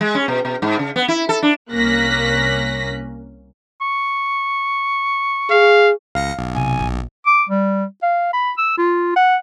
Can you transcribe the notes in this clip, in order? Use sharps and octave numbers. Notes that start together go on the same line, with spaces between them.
G#3
C#4
B2
B2
G#2
C#3
B3
E4
A4
D4
C2 A#3 C#4 F#6 A#6 B6
C#6
G#4 F5
C#2 F5 A#6 C#7
B1
C3 G#5
A#1
D6
G3
F5
B5
E6
F4
F#5